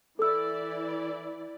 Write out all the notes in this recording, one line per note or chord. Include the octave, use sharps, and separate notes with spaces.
E3 E4 A4 D5 E6